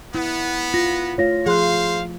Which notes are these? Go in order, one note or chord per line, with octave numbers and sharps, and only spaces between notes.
B3 E4
F4 A#6
A3 F4 C#5 F5 A#6
F3 G#4 C5 F5 C6 F#6